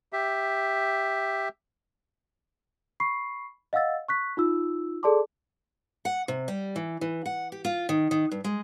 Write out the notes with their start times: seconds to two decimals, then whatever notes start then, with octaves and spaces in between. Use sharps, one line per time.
0.13 G4 E5
3.00 B5 C#6 C7
3.73 D#5 F5 F#5 E6 A6
4.08 C#6 F#6 B6
4.37 D#4 F4 E6
5.03 G#4 A4 D5 A5 C6 D6
6.05 F#5
6.28 C3
6.48 G3
6.76 E3
7.01 E3
7.26 F#5
7.52 G4
7.65 F4
7.89 D#3
8.11 D#3
8.31 G2
8.44 G#3